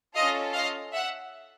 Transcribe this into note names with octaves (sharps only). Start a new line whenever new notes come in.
C#4 F4 A4 D#5 F5
D#5 F5
E5 F#5